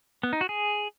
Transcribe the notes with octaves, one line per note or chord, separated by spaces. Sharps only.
B3
D#4
F#4
G#4